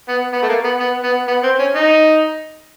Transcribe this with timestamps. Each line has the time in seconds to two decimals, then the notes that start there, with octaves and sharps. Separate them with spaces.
0.09 B3
0.33 B3
0.43 A3
0.49 A#3
0.64 B3
0.80 B3
1.04 B3
1.28 B3
1.43 C4
1.60 C#4
1.76 D#4